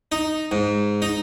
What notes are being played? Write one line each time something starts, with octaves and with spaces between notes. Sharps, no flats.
D#4
G#2
D#4